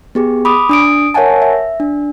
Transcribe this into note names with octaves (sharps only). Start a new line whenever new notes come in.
B3 G4 G#4
B5 D6 D#6
D4 D#6 D7
A#4 C#5 E5 F#5 G#5 A5
E5
D4